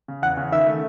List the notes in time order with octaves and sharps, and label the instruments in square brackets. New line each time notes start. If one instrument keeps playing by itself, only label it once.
[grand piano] C#3
[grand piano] E2 [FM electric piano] F#5
[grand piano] C#3
[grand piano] D#3 [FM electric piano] E5
[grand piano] A3